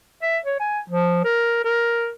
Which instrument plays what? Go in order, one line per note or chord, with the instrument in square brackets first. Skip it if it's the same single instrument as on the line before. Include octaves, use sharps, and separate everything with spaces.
[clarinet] E5
C#5
G#5
F3
A#4
A#4